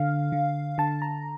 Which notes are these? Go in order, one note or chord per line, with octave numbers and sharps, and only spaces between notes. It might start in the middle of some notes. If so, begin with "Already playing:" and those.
Already playing: D3 F5
D3
D3 A5
A#5